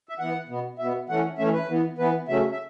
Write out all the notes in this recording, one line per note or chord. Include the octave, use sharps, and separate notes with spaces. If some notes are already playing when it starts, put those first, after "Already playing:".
E5
E3 B3 F#5
B2 B3
B2 B3 E5
E3 A3 C#4 F#5
E3 A3 C#4 E5
B4
E3 B3
E3 B3 B4
C#3 F#3 A3 C#4 E5
E5